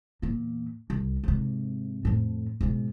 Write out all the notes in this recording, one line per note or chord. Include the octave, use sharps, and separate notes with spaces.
E2 A#2
C2
G#2 C3
F2 A2
G#2 B2